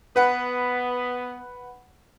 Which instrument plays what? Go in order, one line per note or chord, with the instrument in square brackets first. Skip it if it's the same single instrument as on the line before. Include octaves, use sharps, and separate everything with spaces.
[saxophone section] B3 [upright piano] B4 F#5